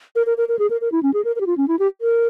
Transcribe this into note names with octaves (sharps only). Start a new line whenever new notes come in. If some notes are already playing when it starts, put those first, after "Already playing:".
A#4
A#4
A#4
A#4
G#4
A#4
A#4
E4
C#4
G#4
A#4
A#4
G4
F4
C#4
E4
G4
A#4